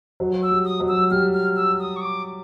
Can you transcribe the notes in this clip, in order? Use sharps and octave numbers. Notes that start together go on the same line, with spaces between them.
F#3
E6
G3
D#6
F#3
E6
G3 F6
F6
E6
D#6
C#6
D6